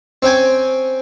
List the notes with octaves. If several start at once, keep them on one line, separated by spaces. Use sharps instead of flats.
C4 C#4 G5 G#5